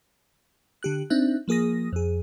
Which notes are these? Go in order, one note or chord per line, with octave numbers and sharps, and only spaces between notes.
D3 G4 F#6
C4 D4 D#4 E5 F#6
F3 A#3 G#4 D#6 A#6
F2 G#4